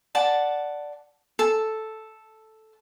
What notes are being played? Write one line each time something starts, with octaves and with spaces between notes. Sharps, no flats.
D5 F#5 A5
A4